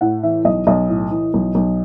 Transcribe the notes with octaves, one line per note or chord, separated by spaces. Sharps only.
A2 F#5
E3 E5
B1 D#5
B1 D#5
A2
E3
B1
B1